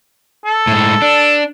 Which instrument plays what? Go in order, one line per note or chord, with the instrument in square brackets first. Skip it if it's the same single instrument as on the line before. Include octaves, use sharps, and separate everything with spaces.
[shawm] A4
[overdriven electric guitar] A2 G#3
D4